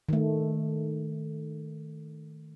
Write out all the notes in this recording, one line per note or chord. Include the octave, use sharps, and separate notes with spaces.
D#3 A3